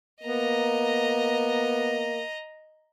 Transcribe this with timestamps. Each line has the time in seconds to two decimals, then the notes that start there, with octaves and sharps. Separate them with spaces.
0.23 A#3 B3 D#5 A#5